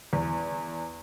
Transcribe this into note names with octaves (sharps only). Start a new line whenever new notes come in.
E2